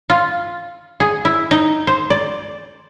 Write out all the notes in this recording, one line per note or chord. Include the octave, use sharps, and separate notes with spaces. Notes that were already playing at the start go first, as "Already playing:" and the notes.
F4
G#4
E4
D#4
C5
D5